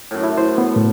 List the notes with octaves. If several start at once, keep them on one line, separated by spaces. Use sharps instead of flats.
F#2 A2
E4
C5
B3
A2